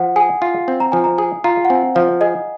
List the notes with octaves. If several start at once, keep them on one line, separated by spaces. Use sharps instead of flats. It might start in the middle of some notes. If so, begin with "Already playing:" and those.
Already playing: F3 F#5
G#4 G#5
F4
C4
A#5
F3 G#5
A#5
G#4 G#5
F4 A#5
F#5
C4 G#5
F3 F5
G#4 D#5